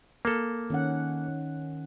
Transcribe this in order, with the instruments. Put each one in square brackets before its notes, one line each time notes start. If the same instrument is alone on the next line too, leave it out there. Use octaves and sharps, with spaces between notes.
[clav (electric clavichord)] A#3 A4
[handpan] D#3 C#4 F#5